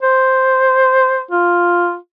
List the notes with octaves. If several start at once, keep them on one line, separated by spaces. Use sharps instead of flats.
C5
F4